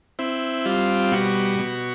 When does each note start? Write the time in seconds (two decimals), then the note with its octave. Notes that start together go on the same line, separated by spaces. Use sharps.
0.19 C4 E4
0.66 G3 F4
1.12 B2 F#4
1.59 B2